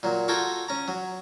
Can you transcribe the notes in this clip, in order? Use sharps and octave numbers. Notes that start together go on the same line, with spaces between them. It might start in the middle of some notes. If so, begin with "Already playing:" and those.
A#2 F#3
F4 F#4 A4 G5 G#5 A#5
C#4 A#5
F#3